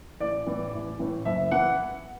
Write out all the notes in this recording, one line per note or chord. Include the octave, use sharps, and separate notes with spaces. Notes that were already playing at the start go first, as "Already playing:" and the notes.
A1 D5
A2 E3
A1
A2 E3
F#1 E5
E3 F#5